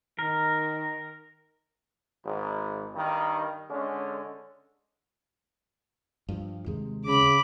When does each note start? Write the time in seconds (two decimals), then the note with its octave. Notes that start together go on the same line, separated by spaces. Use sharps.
0.19 D#3 A#4
2.25 G#1
2.95 G2 D#3
3.69 D3 G#3 C#4
6.29 G2 F3
6.66 D#2 C3 G#3
7.06 C#3 B5 D6